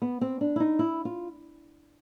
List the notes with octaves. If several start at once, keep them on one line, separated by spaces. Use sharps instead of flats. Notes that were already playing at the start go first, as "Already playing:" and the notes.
B3
C4
D4
E4
D#4
E4
F4